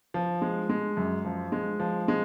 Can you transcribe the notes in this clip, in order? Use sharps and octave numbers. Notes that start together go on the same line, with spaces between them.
F3
G#3
G#3
F#2
F3
G#3
F3
G#3